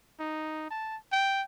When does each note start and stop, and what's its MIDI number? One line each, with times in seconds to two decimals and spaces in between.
0.20 0.70 63
0.71 0.97 81
1.13 1.43 79